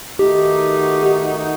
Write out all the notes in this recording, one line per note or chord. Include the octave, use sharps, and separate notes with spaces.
D#3 A3 D#4 F#4 G4